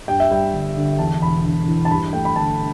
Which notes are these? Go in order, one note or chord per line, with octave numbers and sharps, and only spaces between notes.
G2 G5
E5
G3 G5
G1
D3
E2 A5
E1 B5
E1
E3
A5
G2 B5
A3 G5
B5
G1 A5